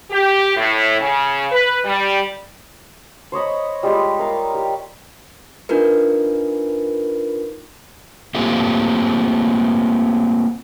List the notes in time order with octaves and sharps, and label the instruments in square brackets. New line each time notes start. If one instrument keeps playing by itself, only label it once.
[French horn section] G4
A2
C#3
B4
G3
[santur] C5 C#5 D#5 B5
G3 G#3 F4 G4
A#4 F5
G4
[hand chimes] D4 D#4 F4 A#4 B4
[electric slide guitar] A3 A#3 C4 F4 G4